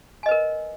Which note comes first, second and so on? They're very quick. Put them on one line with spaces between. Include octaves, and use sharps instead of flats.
G#5 D#5 B4 A#4